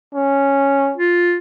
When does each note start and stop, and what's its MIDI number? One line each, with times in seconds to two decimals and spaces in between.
0.15 0.94 61
0.97 1.38 65